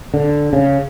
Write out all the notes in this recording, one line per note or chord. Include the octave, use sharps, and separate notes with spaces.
D3
C#3